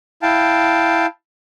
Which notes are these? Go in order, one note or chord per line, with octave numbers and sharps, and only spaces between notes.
E4 F5 G5 A5